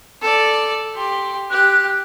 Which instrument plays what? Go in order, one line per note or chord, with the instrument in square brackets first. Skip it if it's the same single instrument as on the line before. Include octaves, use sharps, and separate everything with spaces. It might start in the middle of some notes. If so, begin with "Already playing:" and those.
[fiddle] A4 D5
G4 C6
[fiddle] G4 [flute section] F#6